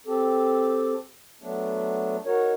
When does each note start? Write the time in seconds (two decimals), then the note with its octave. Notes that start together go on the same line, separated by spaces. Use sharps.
0.07 C4 G4 A4
1.42 F#3 A3 B3 D4
2.25 D#4 F#4 A#4 C#5